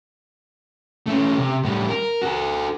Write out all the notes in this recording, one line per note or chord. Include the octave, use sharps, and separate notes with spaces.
A3 C#4
C3
A2 G3
A#4
F#4 A4